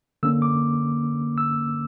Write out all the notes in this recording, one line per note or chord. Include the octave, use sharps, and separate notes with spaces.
D3 A#3 C#4 E6
D6
E6